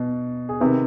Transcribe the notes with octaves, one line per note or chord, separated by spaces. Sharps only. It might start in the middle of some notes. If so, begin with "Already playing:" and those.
Already playing: B2
G#4
C3 D#3 B4